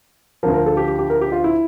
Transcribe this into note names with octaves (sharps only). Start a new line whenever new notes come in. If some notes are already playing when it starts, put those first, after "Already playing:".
D2 D3 F3 A#4
A#4
A4
G4
G4
G4
A#4
G4
F4
E4